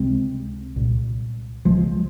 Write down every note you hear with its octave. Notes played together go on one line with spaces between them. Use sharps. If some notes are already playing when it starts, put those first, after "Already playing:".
Already playing: C#2 C3 G#3 C4
C2 A#2
C#2 C#3 F3 G#3